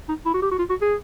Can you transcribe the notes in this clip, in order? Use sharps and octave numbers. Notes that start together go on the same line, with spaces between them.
D#4
E4
F#4
G4
F#4
F4
F#4
G#4